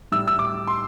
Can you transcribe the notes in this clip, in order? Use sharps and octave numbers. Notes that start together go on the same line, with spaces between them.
A2 G3 E6
E6
D6
C6